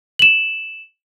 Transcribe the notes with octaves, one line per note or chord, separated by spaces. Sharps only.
E7 F#7